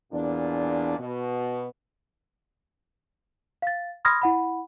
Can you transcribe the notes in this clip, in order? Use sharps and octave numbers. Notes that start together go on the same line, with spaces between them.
E2 A#2 D4
B2
F5 A6
B5 C6 D#6 F6 G#6 A#6
E4 F#5 B5